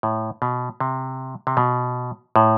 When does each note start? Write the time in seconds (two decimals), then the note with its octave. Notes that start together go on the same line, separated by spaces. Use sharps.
0.03 A2
0.42 B2
0.80 C3
1.47 C3
1.57 B2
2.36 A2